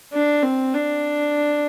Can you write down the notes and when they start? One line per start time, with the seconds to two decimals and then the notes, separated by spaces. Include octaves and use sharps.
0.13 D4
0.43 C4
0.73 D4